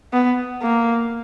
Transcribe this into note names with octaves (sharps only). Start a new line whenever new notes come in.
B3
A#3